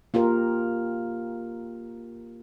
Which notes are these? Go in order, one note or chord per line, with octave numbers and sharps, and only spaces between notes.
A#3 F4 G4 A#4